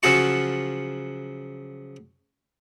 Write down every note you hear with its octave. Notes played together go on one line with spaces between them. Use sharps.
C#3 F3 F#3 F#4 A5 C#6